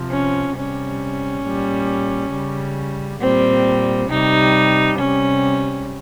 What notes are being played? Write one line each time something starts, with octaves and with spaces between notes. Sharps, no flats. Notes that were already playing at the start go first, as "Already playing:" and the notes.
Already playing: C3 F3
C#4
C3 G3 C#4
A#2 G3
C#3 G3
A#2 G3 C4
C3 G3 D#4
C3 G3 C#4